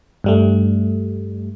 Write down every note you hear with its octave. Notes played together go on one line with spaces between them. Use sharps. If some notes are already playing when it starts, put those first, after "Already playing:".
G2 G3 A3